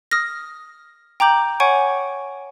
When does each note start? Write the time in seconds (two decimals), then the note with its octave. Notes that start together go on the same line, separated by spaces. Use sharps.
0.11 D#6 F6 A#6
1.20 G5 A#5 D6 G6 F#7
1.60 C#5 F#5 G#5 C#6 G#6 D7